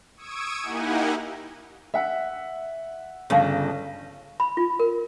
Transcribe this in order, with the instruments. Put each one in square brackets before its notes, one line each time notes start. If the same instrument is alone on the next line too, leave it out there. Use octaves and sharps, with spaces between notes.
[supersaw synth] C#6 D#6 E6 G#6 D7 D#7
A#3 D#4 E4 G4 F#5 G#5
[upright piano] E5 F#5
[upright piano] G1 A5 A#6 [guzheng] C#3
[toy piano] B5
F4
A#4